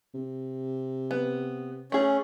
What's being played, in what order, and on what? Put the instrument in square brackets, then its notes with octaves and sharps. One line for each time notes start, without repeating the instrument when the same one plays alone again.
[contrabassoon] C3
[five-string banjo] B3
[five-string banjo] A3 G#4 [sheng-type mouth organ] C#4